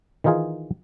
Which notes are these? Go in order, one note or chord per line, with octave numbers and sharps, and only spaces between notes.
D#3 E3 D#4 F4 G#4